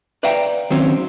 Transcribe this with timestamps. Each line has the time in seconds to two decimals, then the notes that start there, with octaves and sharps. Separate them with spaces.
0.23 B4 D5 E5 F5 G5 A#5
0.70 D#3 F#3 C4 C#4